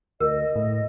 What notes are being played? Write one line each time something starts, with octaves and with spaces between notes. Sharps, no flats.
D2 A#4 D#5
A2